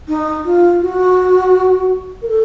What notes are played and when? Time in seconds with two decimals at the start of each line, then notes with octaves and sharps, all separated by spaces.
0.08 D#4
0.45 F4
0.82 F#4
2.22 A#4
2.28 A4